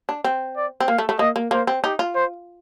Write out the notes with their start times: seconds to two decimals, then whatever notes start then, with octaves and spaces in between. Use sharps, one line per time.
0.09 D4
0.24 C4
0.57 D5
0.80 C4
0.88 A#3 F5
0.98 A3
1.09 A3
1.19 A#3 D#5
1.36 A#3
1.51 A#3 C5
1.67 C4
1.84 D#4 G4
1.99 F4
2.15 C5